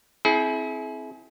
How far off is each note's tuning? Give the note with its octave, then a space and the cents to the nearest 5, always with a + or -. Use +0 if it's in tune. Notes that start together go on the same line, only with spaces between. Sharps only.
C4 +0 E4 -15 G#4 +35